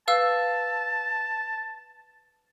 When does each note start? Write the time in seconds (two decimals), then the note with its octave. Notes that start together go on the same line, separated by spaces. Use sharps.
0.08 B4 F5 A5 E6